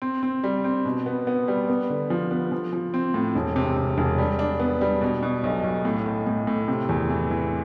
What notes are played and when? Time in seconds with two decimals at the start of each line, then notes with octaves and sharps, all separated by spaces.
0.02 C4
0.23 C4
0.44 G3
0.64 C4
0.85 B2
1.06 B3
1.27 B3
1.48 G3
1.68 B3
1.90 D3
2.10 F3
2.31 B3
2.52 F3
2.73 F3
2.94 C4
3.14 A2
3.35 E1
3.56 C3
3.77 C3
3.98 E1
4.18 G3
4.39 D4
4.60 B3
4.81 G3
5.02 B2
5.23 B2
5.44 B1
5.64 B1
5.85 A2
6.06 A2
6.27 A2
6.47 A2
6.68 C3
6.89 E2
7.10 E3
7.31 E3